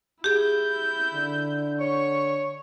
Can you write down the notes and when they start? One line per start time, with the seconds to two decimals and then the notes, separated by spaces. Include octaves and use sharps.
0.24 E4 G4 G#4 G6
1.14 D3
1.80 C#5 C#6